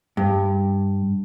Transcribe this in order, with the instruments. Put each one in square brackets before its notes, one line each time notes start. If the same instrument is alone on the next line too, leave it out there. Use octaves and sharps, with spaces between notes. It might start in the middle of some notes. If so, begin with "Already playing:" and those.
[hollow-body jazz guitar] G2